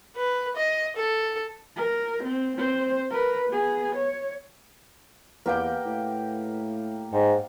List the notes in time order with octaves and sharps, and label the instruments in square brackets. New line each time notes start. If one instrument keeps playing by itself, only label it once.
[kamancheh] B4
D#5
A4
[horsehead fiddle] A#4
C4
C4 C5
A#4 B4
B3 G#4
C#5
[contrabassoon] E2 [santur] A#3 G4 G5 [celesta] B4 F#5
[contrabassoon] A2
[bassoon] G#2 [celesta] G5